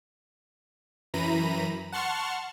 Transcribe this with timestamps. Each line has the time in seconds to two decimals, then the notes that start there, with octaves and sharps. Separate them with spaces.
1.14 F#2 E3 A#5 B5 D#7
1.92 F#5 A5 C6 C#6 F6